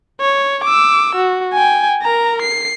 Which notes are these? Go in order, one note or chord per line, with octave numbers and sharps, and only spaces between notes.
C#5
D6 E6
F#4
G5 G#5
A#4 A#5
C7